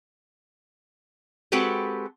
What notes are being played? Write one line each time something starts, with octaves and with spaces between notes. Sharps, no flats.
G#3 C4 F#4 G4 A4 B4